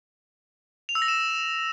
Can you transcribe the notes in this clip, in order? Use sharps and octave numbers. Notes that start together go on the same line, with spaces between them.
F7
E6
A#6
E7